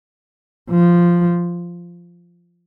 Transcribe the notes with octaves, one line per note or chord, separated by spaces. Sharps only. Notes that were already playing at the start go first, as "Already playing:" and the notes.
F3